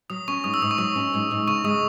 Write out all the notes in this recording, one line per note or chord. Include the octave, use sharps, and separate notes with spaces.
F#3 D#6
C#4 C#6
G#2 D#6
E6
G#2 D#6
C#6
F#3 D#6
C#4
G#2
G#2
C#3 C#6
G#3 D#6